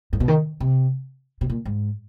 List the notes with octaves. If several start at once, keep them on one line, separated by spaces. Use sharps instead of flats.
G#2
B2
D#3
C3
B2
A#2
G#2